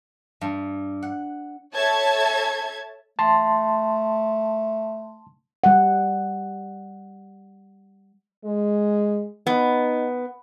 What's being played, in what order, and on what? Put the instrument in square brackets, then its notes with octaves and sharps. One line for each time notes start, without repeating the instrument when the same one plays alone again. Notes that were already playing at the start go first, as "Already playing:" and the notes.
[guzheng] G2
F#5
[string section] A4 C#5 E5 A5 G#6
[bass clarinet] A3 [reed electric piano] A5 C6
[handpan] G3 F#5
[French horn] G#3
[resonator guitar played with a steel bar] B3 [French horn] D#4